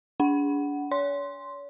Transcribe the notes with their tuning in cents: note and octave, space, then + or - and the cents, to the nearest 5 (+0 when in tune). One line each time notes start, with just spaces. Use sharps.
D4 -35 F#5 +10
C#5 +40 C6 +0